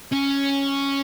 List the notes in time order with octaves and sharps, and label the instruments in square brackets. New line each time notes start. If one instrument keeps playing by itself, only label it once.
[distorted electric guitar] C#4